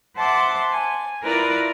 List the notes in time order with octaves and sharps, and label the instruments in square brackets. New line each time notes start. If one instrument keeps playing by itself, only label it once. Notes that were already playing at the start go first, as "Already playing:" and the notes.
[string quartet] C5 E5 F#5 A5 C6 D6
G#5
E4 F4 A#4 B4 D5 A#5